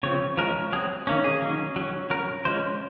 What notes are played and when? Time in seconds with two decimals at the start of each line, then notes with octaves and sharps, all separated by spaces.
0.03 C#3 F3 C4 C#5
0.37 F3 G#3 C#4 A#4
0.73 F#3 C4 G#4
1.07 D#3 A#3 C#4
1.24 G#4
1.42 D#3 F#3 A#3 C#4
1.76 F#3 C#4
2.10 F#3 C#4 A#4
2.45 F3 G#3 C#4 C5